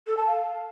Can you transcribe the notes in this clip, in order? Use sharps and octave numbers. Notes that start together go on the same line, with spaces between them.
A4
A5
F5